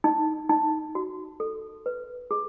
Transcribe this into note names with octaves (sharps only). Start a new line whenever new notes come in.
D#4
D#4
F#4
A4
B4
G#4